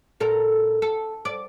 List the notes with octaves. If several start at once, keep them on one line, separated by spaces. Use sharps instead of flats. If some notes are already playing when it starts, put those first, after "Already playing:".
A#2 A4 A#4
A4
D5